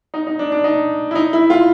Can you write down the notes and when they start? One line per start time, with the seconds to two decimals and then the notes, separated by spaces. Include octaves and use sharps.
0.14 D#4
0.27 D#4
0.39 D4
0.52 D4
0.64 D#4
1.11 E4
1.15 D#4
1.33 E4
1.50 F4